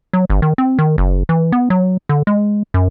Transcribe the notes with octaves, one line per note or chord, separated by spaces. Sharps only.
F#3
G1
D#3
C4
D#3
F#1
E3
B3
F#3
D3
G#3
F#2